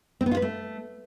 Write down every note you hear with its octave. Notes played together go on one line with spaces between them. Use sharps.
C4
B3
F4
B4
A3